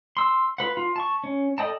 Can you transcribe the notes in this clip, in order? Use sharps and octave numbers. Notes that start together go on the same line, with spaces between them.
C6 E6
F4 B4 F#5
F4
A5 C#6
C#4
A4 D5 D#5 G5 A5